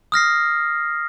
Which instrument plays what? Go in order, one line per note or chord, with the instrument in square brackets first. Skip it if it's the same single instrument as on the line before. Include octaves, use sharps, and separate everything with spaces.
[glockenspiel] D#6 F6 A#6 C7